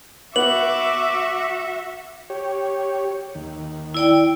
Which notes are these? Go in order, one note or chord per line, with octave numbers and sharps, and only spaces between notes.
B3 F#4 E5 F#5 D6 F#7
G4 C#5
D#2
E4 D5 G5